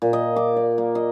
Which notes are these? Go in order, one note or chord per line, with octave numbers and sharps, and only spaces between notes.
A#2
D#5
D6
D5
A#3
D#5